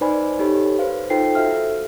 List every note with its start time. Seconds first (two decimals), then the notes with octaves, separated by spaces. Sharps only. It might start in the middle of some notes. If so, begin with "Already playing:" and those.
0.01 D#4 B4 C5 D5 G#5 B5
0.39 D#4 G4 A4 C#5 B5
0.79 B4 C5 F5
1.10 D#4 F4 A4 C5 G5 C7
1.35 F#4 A4 E5 F5 F6